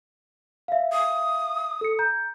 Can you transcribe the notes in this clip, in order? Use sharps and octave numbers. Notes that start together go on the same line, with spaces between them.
E5 F5
D#6
A4 C#7
A#5 G6